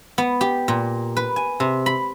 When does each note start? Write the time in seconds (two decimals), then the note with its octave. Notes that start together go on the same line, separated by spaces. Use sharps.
0.18 B3
0.41 G4
0.68 A#2
1.17 B4
1.36 G#5
1.60 C3
1.86 B5